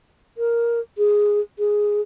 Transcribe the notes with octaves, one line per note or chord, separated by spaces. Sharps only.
A#4
G#4
G#4